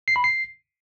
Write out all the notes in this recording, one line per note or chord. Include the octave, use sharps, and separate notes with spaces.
C7
B5
C7